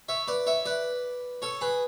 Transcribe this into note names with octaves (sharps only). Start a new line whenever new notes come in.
C#5 E5
B4 D5
C#5 E5
B4 D5
A4 C#5
G#4 B4